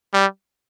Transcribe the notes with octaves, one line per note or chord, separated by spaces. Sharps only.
G3